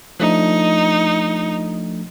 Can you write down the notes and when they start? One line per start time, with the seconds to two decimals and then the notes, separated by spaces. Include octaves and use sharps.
0.20 F3 A3 D4 D#4